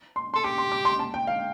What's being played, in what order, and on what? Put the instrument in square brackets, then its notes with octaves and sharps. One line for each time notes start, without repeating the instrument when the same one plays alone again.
[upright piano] C6
[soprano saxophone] A4 [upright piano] C6
[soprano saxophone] G4 [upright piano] D6
[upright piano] C6
D6
C6
A5
G5
F5